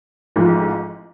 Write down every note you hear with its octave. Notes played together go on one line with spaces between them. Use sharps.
A1 G#2 F3